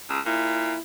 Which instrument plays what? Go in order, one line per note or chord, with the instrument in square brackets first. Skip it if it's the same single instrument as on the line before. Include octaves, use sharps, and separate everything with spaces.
[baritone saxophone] C#2
[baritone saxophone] A#2 [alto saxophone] E4